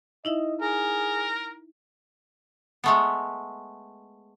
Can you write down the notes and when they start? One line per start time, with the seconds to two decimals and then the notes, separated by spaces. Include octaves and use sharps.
0.25 D#4 E4 D#5 E5
0.61 G#4 A#4
2.84 G#3 A3 B3